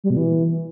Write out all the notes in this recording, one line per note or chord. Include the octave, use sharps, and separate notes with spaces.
G3
B2
E3